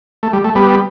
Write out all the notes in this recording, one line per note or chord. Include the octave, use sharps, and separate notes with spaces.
A3
G3
A3
G3 B3